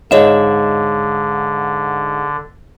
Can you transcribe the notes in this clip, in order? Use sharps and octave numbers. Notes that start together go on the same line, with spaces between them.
G#2 D3 G#4 C#5 D#5 F5 E7